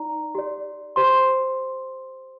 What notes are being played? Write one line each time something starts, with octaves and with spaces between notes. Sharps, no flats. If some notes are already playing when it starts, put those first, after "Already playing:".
Already playing: D#4 D5 A#5
G4 D5
G4 C5 C6